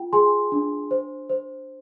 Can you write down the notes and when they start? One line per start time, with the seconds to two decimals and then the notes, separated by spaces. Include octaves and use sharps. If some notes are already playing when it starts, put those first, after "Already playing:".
Already playing: F4 G5
0.13 G#4 G#5 C6
0.52 D4
0.91 C5
1.30 C5